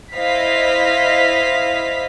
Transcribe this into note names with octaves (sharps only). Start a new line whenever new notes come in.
E4 C5 D#5 F5 B6